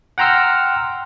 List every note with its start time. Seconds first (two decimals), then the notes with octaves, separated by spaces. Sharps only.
0.18 F#5 G5 A#5 C6 E6 F6